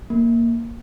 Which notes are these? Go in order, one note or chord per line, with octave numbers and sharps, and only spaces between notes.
A#3